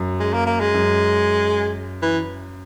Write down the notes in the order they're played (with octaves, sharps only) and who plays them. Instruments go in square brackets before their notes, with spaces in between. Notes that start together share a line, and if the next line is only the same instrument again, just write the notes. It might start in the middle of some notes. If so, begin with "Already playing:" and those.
Already playing: [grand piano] F#2
[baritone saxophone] G#3
A#3
A#3
G#3
[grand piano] F#2
[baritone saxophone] E3